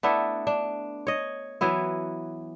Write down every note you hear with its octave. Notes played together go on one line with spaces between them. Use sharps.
A3 B3 D4 E4
D4
C#5 D#5
E3 F#3 B3 E4